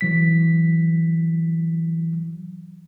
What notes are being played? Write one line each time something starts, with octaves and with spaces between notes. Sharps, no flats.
E3 F#3 B6